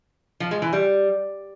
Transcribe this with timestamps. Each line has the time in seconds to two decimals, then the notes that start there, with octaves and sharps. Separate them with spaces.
0.40 F3
0.51 G#3
0.62 E3
0.73 G3